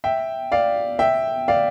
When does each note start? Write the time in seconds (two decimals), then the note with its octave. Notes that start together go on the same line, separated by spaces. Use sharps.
0.04 E5 G5
0.52 D5 F5
0.99 E5 G5
1.48 D5 F5